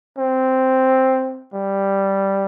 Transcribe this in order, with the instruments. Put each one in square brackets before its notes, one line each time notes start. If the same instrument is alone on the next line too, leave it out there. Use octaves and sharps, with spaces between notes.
[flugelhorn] C4
G3